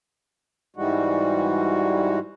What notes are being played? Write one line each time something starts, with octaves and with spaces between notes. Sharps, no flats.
G#2 E3 G3 G#3 F#4